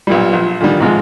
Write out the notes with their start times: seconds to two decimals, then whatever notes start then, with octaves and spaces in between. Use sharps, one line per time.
0.07 B1 A#2 G3
0.33 A#1
0.60 A#2 D3 D#3 G3
0.80 G#2 C3 F3 G#3